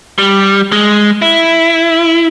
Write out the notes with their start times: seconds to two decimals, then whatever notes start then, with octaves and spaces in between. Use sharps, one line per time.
0.18 G3
0.72 G#3
1.22 E4